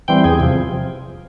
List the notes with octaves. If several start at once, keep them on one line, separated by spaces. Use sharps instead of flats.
E3 G3 C4 G5
E2 G#4
C3 F3